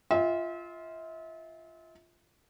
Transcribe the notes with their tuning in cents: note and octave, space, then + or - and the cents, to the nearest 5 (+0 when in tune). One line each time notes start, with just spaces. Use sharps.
F4 -10 E5 -40 G5 +40